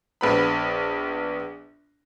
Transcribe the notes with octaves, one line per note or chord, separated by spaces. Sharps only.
A#1 B3 B5